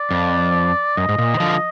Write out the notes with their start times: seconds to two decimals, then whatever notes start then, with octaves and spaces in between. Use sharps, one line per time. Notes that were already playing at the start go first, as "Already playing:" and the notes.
Already playing: D5
0.11 F2
0.97 F#2 D#5
1.09 G#2
1.18 A#2
1.34 D#3
1.40 D3 F3